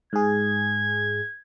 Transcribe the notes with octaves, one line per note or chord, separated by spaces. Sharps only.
G#2 G#4 G#6